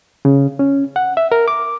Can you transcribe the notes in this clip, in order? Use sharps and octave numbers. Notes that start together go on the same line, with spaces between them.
C#3
C#4
F#5
E5
A#4
D6